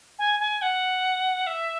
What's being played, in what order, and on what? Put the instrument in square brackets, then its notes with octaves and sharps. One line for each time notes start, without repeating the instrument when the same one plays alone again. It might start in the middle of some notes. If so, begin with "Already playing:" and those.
[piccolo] G#5
G#5
F#5
E5